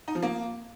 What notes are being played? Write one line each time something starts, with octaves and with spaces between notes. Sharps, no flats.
D#4
F3
A#3